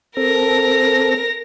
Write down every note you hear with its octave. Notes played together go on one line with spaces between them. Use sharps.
C4 A4 A#4 A#6